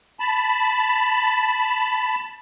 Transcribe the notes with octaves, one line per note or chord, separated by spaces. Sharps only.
A5 B5